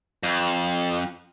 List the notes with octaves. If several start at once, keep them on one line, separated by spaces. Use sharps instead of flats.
F2